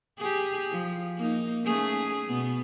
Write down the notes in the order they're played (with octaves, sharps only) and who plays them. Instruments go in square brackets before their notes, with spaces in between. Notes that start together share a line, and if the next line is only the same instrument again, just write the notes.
[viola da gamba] G4 G#4
F3
A#3 D#4
A3 C#4 G#4
B2 B3